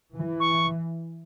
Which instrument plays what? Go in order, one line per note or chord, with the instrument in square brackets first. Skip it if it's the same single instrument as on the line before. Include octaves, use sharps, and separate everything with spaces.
[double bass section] E3
[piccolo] C#6